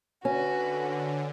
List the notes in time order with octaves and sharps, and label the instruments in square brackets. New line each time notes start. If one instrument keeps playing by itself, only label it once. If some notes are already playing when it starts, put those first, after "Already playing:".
[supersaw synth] D3 [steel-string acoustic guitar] C#4 [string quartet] F#4 B4